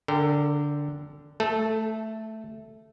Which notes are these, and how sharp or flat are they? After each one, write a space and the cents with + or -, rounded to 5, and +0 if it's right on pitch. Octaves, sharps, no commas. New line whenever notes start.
D3 -10 A#4 -35 G5 +0
A3 +0 A4 -20